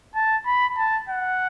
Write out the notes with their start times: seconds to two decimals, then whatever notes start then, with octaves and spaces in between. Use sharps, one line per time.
0.15 A5
0.46 B5
0.77 A5
1.09 F#5